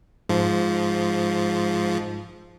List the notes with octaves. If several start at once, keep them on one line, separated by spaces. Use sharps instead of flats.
G#2 F3